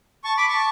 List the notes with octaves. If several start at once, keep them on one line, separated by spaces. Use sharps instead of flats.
A5 C#6
B5 D6
A5 C#6